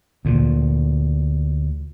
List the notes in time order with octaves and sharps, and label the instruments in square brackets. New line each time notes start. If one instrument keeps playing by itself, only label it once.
[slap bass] D2 A#2